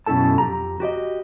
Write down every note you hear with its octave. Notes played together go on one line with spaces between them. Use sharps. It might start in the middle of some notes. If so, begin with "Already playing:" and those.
F#2 B2 C#4 E4 A4 A5
F2 G4 A#5
F#4 G4 D5 D#5